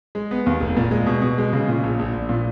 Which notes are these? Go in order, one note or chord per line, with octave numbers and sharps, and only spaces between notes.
G#3
B3
D#2
F1
A#2
G#3
B2
B2
G#3
C#3
A#2
A#1
A#1
A#1
A#2